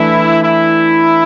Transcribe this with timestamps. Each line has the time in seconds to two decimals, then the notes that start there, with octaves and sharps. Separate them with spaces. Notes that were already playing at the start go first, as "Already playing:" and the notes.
Already playing: E3 A3 D4 E4 B4
0.43 E4